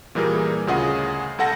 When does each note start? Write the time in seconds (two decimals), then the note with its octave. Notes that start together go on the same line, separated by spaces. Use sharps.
0.15 A#2 E3 G3 G#4 A#4
0.67 D2 C#3 F4 G#4 D#5 F#5
1.38 C2 A4 F#5 A#6